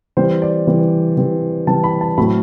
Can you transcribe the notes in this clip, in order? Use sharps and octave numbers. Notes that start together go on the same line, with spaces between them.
E3 G3 C4 C5
D5
E3 G3 C4
E3 G3 C4
E3 G3 C4 A5
B5
A5
A2 F#3 A3 C4 B5